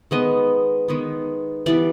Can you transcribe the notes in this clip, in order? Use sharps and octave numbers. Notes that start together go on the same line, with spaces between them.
D#3 G#3 B3 D#5
D#3 G#3 B3
E3 G3 B3 D5